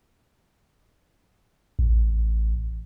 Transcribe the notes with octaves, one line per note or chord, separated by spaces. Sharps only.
A1